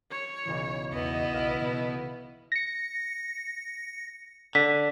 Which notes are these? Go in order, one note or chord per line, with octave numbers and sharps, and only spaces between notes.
C#5 G#6 E7
B1 C#3 E3
E2 B3 E4 D#5
B1 F5 E6
B2
A#6 C#7
D3 B6